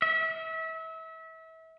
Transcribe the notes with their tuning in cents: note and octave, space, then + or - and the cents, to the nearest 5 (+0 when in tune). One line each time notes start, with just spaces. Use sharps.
E5 -30